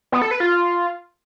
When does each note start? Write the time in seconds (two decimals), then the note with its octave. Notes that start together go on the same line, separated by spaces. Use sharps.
0.12 B3
0.22 A4
0.31 B4
0.40 F4